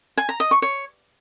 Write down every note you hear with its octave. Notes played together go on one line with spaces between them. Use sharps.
G#5
A#5
D#5
C#6
C#5